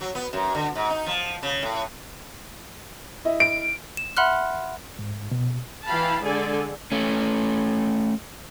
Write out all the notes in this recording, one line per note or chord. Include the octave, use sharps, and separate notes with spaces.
F#3
B3
F#2
D3
G#2
D#4
F3
C#3
A2
E4 D#5 E5
D7
E7
E5 F#5 B5 C6 F6 F#6
G#2
B2
E3 E4 F5 G5 A5 B5
D3 G#3 G#4 A4 D5 G#5
A3 C#4